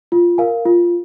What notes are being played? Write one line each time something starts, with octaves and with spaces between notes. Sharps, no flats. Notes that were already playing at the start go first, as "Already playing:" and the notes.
F4
A#4 F5 G#5
F4